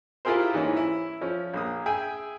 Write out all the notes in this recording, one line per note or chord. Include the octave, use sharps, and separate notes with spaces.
E4 F4 G4 G#4 A#4 C5
G#2 E3 A#3 C#4
E4
F3 C#4
A#1 A#3 D#6
G#4 E5 G5 G#5